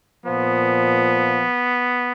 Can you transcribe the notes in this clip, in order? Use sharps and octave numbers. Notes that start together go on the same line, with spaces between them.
A#2 F3 B3